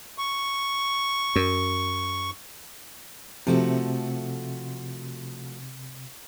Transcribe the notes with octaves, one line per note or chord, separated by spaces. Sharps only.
C#6
F#2
C3 F3 A3 F#4